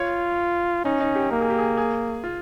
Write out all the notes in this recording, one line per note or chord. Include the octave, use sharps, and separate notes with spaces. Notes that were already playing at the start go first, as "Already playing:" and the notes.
Already playing: F4 C#5
C#4 D#4
D#4
G4
A#3 A#4
G#4
G4
G#4
G#4
F4